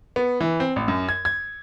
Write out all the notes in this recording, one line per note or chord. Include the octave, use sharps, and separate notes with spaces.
B3
E3
C4
A1
F#2
G#6
G#6